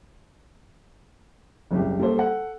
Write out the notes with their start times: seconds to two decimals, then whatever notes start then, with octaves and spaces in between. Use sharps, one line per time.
1.71 F#1 C2 G4
2.00 G3 A#3 A4 C5
2.17 A4 F#5